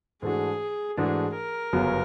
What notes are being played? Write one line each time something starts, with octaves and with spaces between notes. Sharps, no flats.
G#2 E3 A3 D4 F#4 G#4
G#2 E3 A3 D4 F#4 G#4
A#4
G1 F#2 C#3 F#3 B3